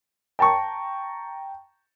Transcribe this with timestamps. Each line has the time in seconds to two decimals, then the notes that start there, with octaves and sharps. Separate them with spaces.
0.39 G5 A5 A#5 C#6